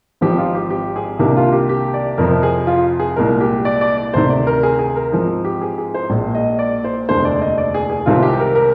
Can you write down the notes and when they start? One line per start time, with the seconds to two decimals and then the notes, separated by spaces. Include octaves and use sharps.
0.21 G#1 G#2 F3 C4 G4
0.38 F4
0.55 G4
0.70 G4
0.96 G#4
1.19 C2 C3 D#3 A#3 D4 G4
1.37 F4
1.52 G4
1.69 G4
1.94 D5
2.18 F2 C3 F3 C4 A#4
2.43 G#4
2.67 F4
3.00 G#4
3.16 C2 A#2 G#3 A#4
3.41 G4
3.65 D5
3.81 D5
3.97 D5
4.14 D2 C3 D#3 C5
4.30 D5
4.47 A#4
4.63 G#4
4.79 G#4
4.96 A#4
5.12 G#2 F3 C4 G#4
5.45 G4
5.61 G#4
5.78 G#4
5.94 C5
6.10 A#1 A#2 G#3
6.35 D#5
6.59 D5
6.84 C5
7.08 F1 D#2 D3 G#3 D4 C5
7.25 D5
7.41 D#5
7.58 D5
7.74 G#4
7.90 G#4
8.06 C2 C3 D#3 G#3 C4 F4
8.23 G4
8.40 A#4
8.55 A#4